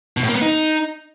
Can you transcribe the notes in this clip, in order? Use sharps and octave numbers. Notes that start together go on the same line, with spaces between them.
B2
A2
A#3
B3
D#4